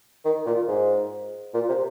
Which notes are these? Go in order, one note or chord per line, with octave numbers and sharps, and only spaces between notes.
D#3
A#2
G#2
A#2
C3